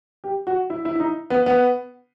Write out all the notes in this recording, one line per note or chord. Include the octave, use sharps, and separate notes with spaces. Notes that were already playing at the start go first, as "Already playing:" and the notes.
G4
F#4
E4
E4
E4
D#4
B3
B3